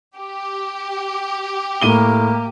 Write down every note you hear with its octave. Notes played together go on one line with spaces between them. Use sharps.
G4
A2 A#3 D#7 G7